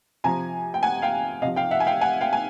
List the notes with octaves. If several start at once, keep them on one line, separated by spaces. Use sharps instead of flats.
C3 F3 G#5 A#5
G5
F#5 G#5
F5 G5
C3 F3 D#5 F5
F5 G5
E5 F#5
G#5
F5 G5
F#5 G#5
F5 G5
G#5